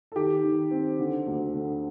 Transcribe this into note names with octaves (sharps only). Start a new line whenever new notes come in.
A4
D#3 G4
D#3
C4
D3
D2
D3